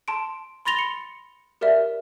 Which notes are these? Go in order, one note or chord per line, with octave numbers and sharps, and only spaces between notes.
A5 C6 D7
B5 C6 A6 A#6 F7 G7
C#7
G4 A#4 D5 E5